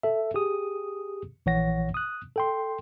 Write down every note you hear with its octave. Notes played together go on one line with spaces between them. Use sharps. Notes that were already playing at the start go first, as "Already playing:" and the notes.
A4 E5
G4 G#4 D#6
A#1 E3 C#5 F#5 A#6
D#6 F#6
A4 G5 C6